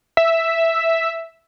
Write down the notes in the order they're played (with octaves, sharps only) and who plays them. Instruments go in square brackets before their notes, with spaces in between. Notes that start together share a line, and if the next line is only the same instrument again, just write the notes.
[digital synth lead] E5